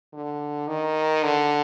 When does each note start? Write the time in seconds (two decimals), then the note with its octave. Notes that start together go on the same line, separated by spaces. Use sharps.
0.13 D3
0.68 D#3
1.23 D3